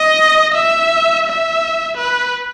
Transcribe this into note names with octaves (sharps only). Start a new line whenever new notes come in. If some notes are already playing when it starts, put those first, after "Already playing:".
Already playing: D#5
E5
E5
B4